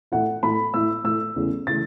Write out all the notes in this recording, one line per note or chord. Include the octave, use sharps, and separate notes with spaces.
A2 A3 E4 F#5
A2 A3 E4 B5
A2 A3 E4 E6
A2 A3 E4 E6
E2 C#3 E3 A3 C#4
C#3 E3 A3 A6